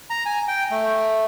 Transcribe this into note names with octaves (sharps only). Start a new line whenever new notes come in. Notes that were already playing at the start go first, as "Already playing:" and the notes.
A#5
G#5
G5
A3